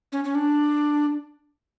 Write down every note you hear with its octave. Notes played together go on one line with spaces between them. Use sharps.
C#4
C#4
D4